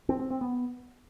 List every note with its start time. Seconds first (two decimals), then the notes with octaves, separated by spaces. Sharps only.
0.09 C4
0.20 C4
0.30 C4
0.41 B3